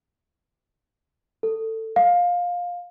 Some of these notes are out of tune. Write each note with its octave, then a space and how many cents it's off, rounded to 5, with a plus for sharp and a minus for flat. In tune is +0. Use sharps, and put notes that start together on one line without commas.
A4 +20
F5 +15